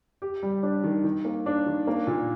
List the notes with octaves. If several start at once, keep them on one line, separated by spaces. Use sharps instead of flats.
G4
G3
D4
D#3
D#3
A#3
D4
D#3
A#3
A#2